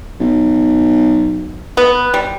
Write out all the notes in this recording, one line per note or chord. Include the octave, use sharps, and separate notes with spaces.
B1
B3
G3